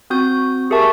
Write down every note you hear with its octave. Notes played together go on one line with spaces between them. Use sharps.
C4 F#4 D#6 G6
G4 G#4 A#4 E5 A5 C#6